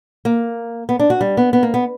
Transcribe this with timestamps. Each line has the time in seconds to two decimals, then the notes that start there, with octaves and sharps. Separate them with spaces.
0.25 A#3
0.89 B3
0.99 D4
1.10 F#4
1.21 G3
1.37 B3
1.53 B3
1.63 A#3
1.74 B3